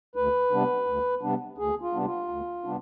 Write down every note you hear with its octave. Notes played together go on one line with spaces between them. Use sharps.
D2 B4
C3 G3 B3 D4
D2
C3 G3 B3 D4
D2 G#4
F4
C3 G3 B3 D4
F4
D2
C3 G3 B3 D4